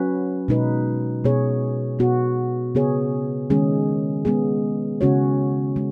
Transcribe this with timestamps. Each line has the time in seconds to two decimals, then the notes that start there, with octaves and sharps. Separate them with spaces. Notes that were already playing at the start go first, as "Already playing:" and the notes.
Already playing: F#3 C#4 F#4 B4
0.48 B2 G#3 D#4 B4
1.24 B2 B3 G#4 C#5
1.99 B2 B3 F#4
2.75 C#3 B3 G#4 C#5
3.50 D#3 G#3 C#4 G#4
4.25 G#3 B3 G#4
5.01 C#3 G#3 C#4 F#4 C#5
5.76 G#3